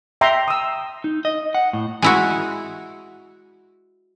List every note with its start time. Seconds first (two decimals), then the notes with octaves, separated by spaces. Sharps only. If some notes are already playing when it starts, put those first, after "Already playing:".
0.21 E5 G5 A#5 C6
0.48 D#6 E6
1.04 D#4
1.25 D#5
1.55 F#5
1.73 A2
2.02 G#3 E4 F#4